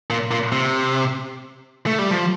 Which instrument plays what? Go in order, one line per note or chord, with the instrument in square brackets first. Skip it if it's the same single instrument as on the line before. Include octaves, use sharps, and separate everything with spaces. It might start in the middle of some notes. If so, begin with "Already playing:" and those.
[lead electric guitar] A#2
A#2
C3
A3
G3
F3